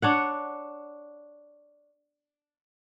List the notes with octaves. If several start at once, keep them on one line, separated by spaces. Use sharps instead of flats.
D4 C#5 F#5